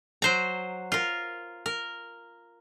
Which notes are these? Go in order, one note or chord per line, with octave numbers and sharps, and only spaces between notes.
F#3 C5 A#5
F4 A#4
A#4